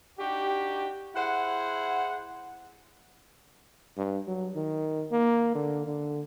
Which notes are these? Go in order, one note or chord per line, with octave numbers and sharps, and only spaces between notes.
D4 D#4 F#4 G4
E4 G#4 C5 F#5
G2
F#3
D#3
A#3
D3
D3